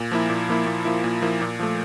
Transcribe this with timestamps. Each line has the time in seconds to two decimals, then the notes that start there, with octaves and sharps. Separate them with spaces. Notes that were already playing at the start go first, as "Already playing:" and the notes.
Already playing: A#2
0.12 F3 A#3 E4
0.30 A#2
0.49 F3 A#3 E4
0.66 A#2
0.85 F3 A#3 E4
1.04 A#2
1.22 F3 A#3 E4
1.42 A#2
1.60 F3 A3